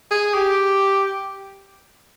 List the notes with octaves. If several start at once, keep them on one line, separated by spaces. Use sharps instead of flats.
G#4
G4